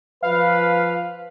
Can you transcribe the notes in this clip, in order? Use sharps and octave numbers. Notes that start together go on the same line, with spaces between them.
F3 B4 F5